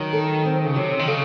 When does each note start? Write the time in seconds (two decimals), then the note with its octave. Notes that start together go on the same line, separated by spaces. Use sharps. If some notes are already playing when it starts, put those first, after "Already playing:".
Already playing: D#3 F#3
0.13 A4
0.45 C4
0.66 C#3
0.76 C3 F#3
0.99 D#3
1.08 C#3 A4